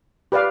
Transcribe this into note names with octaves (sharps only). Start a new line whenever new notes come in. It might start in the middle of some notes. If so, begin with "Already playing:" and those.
G4 B4 D5 F5